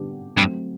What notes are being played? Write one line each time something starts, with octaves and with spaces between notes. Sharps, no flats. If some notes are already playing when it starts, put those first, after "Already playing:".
Already playing: D3 G3 B3 D4 G4
G2 F#3 A3 C4